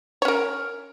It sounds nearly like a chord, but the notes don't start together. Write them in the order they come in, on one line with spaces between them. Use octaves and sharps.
C#5 C#4 A#4